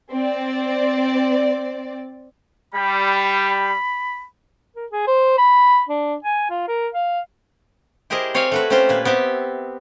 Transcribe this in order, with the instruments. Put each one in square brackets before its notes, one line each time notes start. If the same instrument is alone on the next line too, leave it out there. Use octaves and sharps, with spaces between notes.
[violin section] C4 D5
[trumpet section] G3 [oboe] B5
[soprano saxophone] A#4
G#4
C5
B5
D4
G#5
F4
A#4
F5
[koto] E4 G4 G#4 A#4 C5 D#5
C4 C#5 D5 F5 G#5
A3 F#4 B4
C4 C#4 F4 G4 B4 C5
A#2 A#3 B4
B3 C4 G4 E5